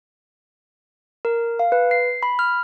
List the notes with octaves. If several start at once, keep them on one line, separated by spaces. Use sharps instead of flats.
A#4
F5
B4
C7
B5
F6